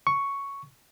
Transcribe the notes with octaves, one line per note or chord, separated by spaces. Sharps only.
C#6